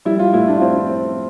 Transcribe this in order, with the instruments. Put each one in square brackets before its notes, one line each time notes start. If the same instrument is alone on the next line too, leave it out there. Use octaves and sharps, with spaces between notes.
[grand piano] G3 E4
F4
A2 E4
D4
F4
C4 E4
C4